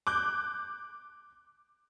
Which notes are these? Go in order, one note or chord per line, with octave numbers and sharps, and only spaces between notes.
D6 F#6 G6